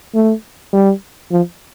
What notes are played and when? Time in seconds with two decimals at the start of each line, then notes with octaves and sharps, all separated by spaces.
0.14 A3
0.73 G3
1.32 F3